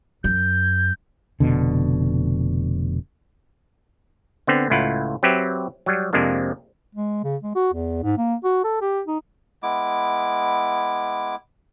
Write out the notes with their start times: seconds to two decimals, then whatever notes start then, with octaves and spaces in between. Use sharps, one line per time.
0.24 F#2 G6
1.40 F1 B2 D3
4.47 D3 B3 C4
4.70 C#2 A2 E4 F4 F#5
5.23 F#3 C4 G4 B4 E5
5.86 F#3 G3
6.13 F2 C3 F3 G#3 A#3 D4
6.95 G#3
7.24 C#3
7.43 G#3
7.55 F#4
7.74 E2
8.03 G#2
8.18 A#3
8.44 F#4
8.64 A4
8.81 G4
9.07 D#4
9.63 G#3 B3 E4 D6